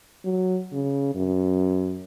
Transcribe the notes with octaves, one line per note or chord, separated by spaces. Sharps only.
F#3
C#3
F#2